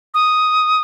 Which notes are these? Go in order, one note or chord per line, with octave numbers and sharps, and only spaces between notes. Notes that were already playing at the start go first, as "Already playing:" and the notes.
D#6